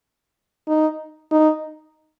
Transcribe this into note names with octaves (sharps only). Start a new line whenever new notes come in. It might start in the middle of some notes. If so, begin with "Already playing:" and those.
D#4
D#4